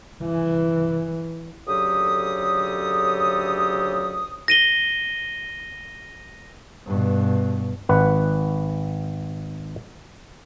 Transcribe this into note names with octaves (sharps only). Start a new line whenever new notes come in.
E3
D2 C#3 F#3 G4 A4 D#6
A#6 D#7 G7
G2 B2
G#1 B4 F#5